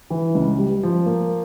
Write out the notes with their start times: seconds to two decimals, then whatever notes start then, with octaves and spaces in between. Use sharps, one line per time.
0.10 E3
0.35 C#2
0.59 G3
0.83 F3
1.06 A#3